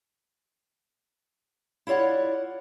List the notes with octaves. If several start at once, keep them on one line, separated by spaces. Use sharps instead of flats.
E4 F4 C#5 D5 F#5